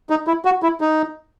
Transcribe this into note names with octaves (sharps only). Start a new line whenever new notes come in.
D#4
E4
F#4
E4
D#4